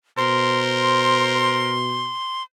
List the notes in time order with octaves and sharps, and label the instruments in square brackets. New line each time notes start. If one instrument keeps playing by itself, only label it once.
[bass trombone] B2 [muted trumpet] A#4 [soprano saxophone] C5 [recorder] C6